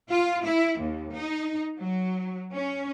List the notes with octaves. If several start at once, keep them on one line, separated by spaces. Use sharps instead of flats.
F4
E4
D#2
D#4
F#3
C#4